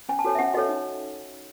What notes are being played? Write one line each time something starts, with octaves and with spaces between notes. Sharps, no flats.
C#4 G#5
A5
F#4 A4 C#5 G#5
E5
C#4 F#5
F#4 A4 C#5 D#5
D#4 C#5